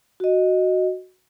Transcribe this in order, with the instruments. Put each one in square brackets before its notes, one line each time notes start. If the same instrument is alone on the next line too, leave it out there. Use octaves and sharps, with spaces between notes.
[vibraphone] F#4 D#5